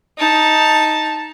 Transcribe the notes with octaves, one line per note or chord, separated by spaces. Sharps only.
D#4 A5